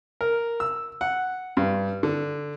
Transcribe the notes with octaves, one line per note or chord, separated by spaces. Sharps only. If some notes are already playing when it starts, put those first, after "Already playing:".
A#4
E6
F#5
G2
D3